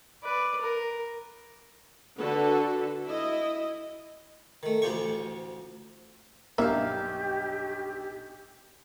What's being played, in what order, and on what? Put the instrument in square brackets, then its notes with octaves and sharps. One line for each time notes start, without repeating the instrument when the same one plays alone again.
[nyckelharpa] B4 D5
A#4
[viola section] D3 F#4 A4 B4
E4 D#5
[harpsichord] D#3 A3
A1 D2 F3 G4 C#6
[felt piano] B1 G2 [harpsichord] A#3 [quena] G4 [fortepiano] E5 F5